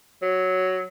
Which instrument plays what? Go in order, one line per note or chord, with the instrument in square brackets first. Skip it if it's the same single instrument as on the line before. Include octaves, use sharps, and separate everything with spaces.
[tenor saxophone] F#3